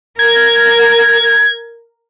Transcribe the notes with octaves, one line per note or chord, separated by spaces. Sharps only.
A#4 G#6